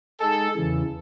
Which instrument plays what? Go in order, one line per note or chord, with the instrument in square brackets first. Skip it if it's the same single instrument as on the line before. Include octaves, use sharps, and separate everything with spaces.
[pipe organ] G#3 D#4 G#4 [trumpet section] A4
[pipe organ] E2 C#3 E3